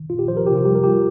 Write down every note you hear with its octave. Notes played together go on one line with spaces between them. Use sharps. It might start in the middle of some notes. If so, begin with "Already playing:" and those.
Already playing: D#3
A#2 F4
G4
F3 C5
A#4
C3 G4
F4
G3 G4
A#4
G3 G4